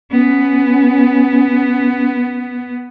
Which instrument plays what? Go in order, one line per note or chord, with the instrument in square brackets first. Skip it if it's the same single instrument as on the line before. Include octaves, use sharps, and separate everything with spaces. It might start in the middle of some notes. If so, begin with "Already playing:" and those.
[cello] B3 [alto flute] C#4